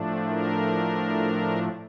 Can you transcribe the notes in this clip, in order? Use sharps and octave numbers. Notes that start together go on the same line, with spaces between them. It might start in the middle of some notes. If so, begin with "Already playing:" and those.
Already playing: A2 F3 A3 D4
A#4